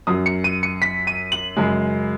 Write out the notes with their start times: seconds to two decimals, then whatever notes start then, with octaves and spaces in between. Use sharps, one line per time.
0.07 F#2 F#3 D#6
0.26 C#7
0.44 D#7
0.63 C#7
0.82 B6
1.07 D#7
1.32 F#7
1.57 F#2 C#3 G#3